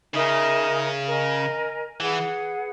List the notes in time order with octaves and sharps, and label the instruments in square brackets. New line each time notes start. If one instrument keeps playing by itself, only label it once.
[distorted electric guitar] C#3 [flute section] D#4 A#4 E5 G#5
[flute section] A#4 D#5 G#5
[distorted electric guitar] E3 [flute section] G#4 B4 F#5